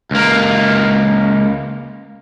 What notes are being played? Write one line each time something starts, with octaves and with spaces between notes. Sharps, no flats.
C#2 A#3